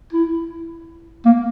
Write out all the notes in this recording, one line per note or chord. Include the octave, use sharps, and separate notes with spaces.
E4
A#3